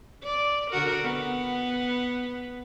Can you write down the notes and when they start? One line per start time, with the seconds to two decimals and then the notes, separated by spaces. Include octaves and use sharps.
0.24 D5
0.71 D3 F#4 A#4
1.03 B3